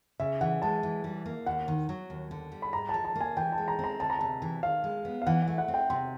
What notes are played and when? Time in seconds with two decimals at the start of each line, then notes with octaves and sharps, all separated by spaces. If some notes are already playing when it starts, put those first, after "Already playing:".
0.20 C#3 E5
0.41 E3 F#5
0.62 G#3 A5
0.83 E3
1.04 G3
1.26 A#3
1.46 D#2 F#5
1.68 D#3
1.89 F#3
2.10 D#2
2.31 D3
2.52 G3
2.62 B5
2.73 G#2 A#5
2.89 F3 A5
3.05 A5
3.15 A#3
3.21 G#5
3.37 E3 G5
3.52 A5
3.58 G#3
3.68 A#5
3.79 C4 A#5
4.00 D2 A5
4.10 A#5
4.19 C3 A5
4.42 E3
4.63 D#3 F5
4.84 G#3
5.05 B3
5.22 F5
5.27 E3 F#5
5.42 F#5
5.48 A3
5.58 F#5
5.68 C4
5.74 G5
5.90 C3 C6